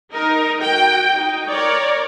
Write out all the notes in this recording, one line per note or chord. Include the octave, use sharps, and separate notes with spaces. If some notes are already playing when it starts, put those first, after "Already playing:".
D#4 A#4
F#4 G5
D#4
A#4 C#5 D5